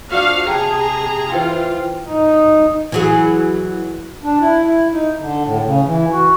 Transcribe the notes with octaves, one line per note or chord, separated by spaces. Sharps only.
F3 D4 F#4 F5
C3 G#4 G5 A5 A#5
E3 F4 C5 G5
D#4
E3 F#3 G#4
D4
E4
E4
D#4
D3
A2
C#3
E3
F#4